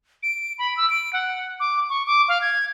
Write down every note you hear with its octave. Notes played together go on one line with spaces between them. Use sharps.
D7
B5
E6
D7
F#5
D6
C#6
D6
F5
G#6